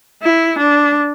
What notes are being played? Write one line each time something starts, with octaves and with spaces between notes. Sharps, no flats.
E4
D4